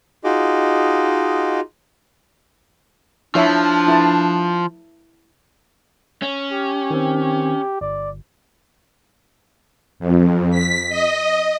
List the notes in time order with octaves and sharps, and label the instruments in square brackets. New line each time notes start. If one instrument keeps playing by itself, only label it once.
[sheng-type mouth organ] D#4 F4 F#4 G#4 D#5 D6
[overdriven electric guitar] F3 [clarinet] D4 [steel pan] E4 C#5 E5
[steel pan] E4 A5
[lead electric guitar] C#4
[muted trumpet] G4
[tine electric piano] D#3 C4
[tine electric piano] G1 [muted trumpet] D5
[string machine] F2
B6
D#5